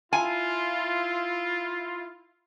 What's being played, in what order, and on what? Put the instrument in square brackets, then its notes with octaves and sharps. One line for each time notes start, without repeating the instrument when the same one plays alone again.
[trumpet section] E4 F4 [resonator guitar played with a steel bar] G#5